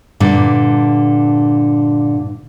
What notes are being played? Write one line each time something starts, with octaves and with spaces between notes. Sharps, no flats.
G2 A#2 D3